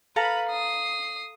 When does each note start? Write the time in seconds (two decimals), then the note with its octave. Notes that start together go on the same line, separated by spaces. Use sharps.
0.16 A4 B4 F5 A#5 B5
0.50 D#6 C7